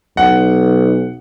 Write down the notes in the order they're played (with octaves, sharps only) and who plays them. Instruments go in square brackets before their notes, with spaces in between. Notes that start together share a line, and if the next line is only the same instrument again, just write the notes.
[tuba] B1 [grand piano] F#5